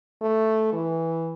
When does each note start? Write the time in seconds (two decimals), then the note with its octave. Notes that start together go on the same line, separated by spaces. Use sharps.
0.22 A3
0.73 E3